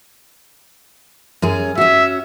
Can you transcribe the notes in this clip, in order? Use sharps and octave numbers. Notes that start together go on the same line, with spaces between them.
F#2 C#4 G#4
C#4 F#4 E5